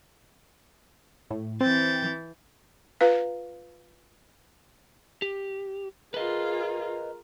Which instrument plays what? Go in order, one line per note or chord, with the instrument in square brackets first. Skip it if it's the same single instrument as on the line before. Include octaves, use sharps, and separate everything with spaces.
[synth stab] A2
[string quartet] E3 G6 A6 [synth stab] C4
[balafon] F4 B4 F5
[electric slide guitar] G4
[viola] F4 G#4 [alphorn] A#4 [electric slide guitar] B4 D#5